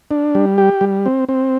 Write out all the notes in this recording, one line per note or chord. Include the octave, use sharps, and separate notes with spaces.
D4
G3
G4
G3
C4
C4